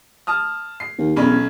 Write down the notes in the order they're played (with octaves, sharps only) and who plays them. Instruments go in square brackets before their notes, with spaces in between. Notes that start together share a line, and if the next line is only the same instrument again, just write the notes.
[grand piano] A5 D#6 F6
C7
[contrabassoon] D#2
[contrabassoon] E1 [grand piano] B1 C#4 B5